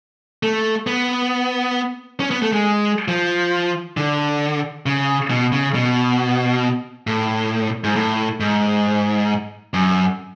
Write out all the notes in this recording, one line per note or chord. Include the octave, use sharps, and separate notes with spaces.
A3
B3
C#4
B3
A3
G#3
F3
D3
C#3
B2
C#3
B2
A2
G#2
A2
G#2
F#2